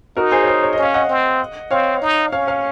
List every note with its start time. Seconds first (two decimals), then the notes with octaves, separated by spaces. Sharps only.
0.17 D#4 F#4 A#4
0.32 G#4 C5
0.43 C#5
0.47 G#4 C5
0.63 C#5
0.73 C#4 D#5
0.83 F5
0.94 D#5 F#5
1.09 C4
1.71 C4 C#5 F5
2.02 D#4
2.32 C#4 C#5 F5
2.47 C#5 F5